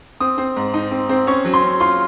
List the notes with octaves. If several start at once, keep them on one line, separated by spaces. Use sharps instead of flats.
C4 D#6
C4
G#2
D#4
C4
C4
C#4 C#6
F#3
C6
C#4
F4 C6